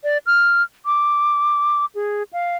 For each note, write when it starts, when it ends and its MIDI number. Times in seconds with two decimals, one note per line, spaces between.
0.04 0.18 74
0.26 0.62 89
0.86 1.85 86
1.95 2.23 68
2.33 2.57 77